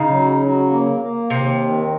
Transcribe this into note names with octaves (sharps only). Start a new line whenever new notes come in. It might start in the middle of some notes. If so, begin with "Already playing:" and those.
Already playing: C#3 D#4
F#3
F#3
A#3
A#3
D#2 C3
D#3